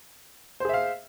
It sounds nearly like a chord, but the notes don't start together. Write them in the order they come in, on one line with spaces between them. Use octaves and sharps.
C5 G#4 E5 F5